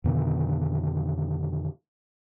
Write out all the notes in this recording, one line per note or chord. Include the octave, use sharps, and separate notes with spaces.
F2 B2 D3 D#3